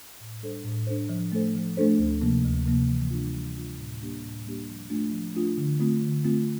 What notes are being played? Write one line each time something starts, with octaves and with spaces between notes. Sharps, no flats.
A2
G3 D4 A4 C5
A2
G3 D4 A4 C5
F3
A3 D4 A4 C5
F3
A3 D4 A4 C5
D2
C3 F3 A#3
D2
C3 F3 A#3
E3
G3 D4 F4
E3
G3 D4 F4
A2
G3 A#3 D4 G4
A2
G3 A#3 D4 G4
F3
A3 D4 F4
F3
A3 D4 F4
D3
A3 C4 F4
D3
A3 C4 F4